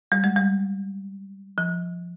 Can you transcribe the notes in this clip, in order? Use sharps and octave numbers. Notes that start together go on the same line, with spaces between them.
G3
G#3
G3
F3